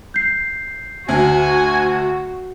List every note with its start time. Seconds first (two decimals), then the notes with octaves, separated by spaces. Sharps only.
0.14 G6 C7
1.08 D2 F#4 G#5